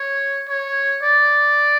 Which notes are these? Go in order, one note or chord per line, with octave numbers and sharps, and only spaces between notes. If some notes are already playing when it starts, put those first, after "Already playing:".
Already playing: C#5
C#5
D5